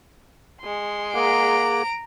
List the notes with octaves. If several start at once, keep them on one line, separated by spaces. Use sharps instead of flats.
G#3 C6
A#3 G#4 F#5 A#5 D7